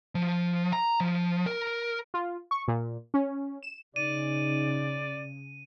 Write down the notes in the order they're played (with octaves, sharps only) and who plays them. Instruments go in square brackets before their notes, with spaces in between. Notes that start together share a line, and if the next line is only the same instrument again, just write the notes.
[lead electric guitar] F3
A#5
F3
A#4
[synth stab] F4
C#6
A#2
C#4
E7
[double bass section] C#3 [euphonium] D#4 [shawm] D5 [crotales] D#7